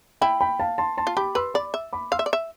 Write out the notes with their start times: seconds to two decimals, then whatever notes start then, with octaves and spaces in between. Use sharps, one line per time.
0.21 E4 G5 B5
0.41 G5 B5
0.60 F5 A5
0.78 A5 C6
0.98 A5 C6
1.07 F4
1.17 G4 B5 D6
1.35 B4 C6 E6
1.54 D5 B5 D6
1.74 E5
1.93 B5 D6
2.12 F5 C6 E6
2.19 E5
2.26 D5
2.33 E5